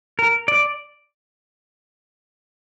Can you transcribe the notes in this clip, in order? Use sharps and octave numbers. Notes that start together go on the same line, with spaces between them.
A#4
D5